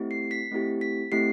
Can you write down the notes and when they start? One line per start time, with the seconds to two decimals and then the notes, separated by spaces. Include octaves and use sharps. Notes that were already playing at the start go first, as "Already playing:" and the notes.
Already playing: A3 C4 E4 G4
0.11 C7
0.31 B6
0.51 A3 C4 E4 G4
0.81 B6
1.12 A3 C4 E4 G4 C7